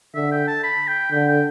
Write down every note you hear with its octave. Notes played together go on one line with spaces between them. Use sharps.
D3 E5
G5
A5
B5
G5
D3 G5
G5